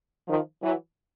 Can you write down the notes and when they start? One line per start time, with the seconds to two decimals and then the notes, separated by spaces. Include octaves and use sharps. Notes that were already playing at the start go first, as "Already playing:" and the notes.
0.28 D#3 F3
0.62 E3 F#3